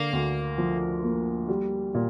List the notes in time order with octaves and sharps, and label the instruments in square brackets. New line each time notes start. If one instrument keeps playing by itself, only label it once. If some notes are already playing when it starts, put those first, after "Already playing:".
Already playing: [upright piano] D3 [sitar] A#3
[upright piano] D2
F3
A#3
G3
A#2